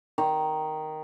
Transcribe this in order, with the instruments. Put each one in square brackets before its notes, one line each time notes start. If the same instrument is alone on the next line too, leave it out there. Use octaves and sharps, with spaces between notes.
[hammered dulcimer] D#3